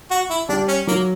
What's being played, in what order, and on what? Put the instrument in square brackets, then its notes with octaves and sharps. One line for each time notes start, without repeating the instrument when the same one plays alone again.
[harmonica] F#4
E4
[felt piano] G3 [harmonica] D4
[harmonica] C#4
[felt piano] F#3 [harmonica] A#3